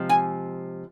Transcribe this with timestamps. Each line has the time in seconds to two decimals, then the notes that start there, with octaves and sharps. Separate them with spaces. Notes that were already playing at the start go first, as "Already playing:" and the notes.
Already playing: C3 F3 G#3
0.09 G#5